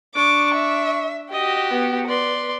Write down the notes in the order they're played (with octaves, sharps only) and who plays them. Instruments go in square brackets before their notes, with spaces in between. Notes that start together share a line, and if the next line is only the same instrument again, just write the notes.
[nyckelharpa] D4 C#6 [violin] D6
[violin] E5
[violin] F#4 G4 [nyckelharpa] D#5
[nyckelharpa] B3
[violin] B4 [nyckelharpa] D5 C6